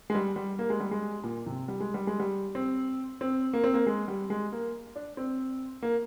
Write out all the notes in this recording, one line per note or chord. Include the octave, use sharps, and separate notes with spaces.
G#3
G3
G3
A#3
G#3
G3
G#3
A#2
C3
G3
G#3
G3
G#3
G3
C4
C4
A#3
C4
A#3
G#3
G3
G#3
A#3
D4
C4
A#3